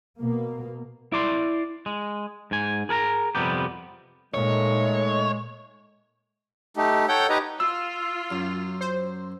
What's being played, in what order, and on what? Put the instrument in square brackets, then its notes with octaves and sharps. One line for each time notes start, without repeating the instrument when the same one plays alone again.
[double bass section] B2 A#3
[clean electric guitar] E4 D5 C6
G#3
G#2 G#5
G#4 A#4 A5 A#5
F2 C3 G3 B3 G4
[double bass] A#2 [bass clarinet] G#3 [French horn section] A3 D#4 [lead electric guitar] C#5
[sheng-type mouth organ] A3 D#4 G4
A4 C#5 F#5 G5 G6
D#4 G4 B4 D#5 A#5
[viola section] F4 [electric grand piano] E6
[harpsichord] F#2
[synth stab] C5